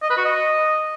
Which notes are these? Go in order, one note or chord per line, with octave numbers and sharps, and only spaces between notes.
D#5
B4
F#4
D#5